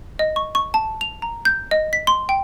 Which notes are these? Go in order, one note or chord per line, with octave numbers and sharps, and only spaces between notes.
D#5
C#6
C#6
A5
F7
A#5
G6
D#5
B6
C6
G5